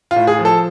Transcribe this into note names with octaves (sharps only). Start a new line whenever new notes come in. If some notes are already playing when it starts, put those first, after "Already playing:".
F4
A2
G#4
F3
A4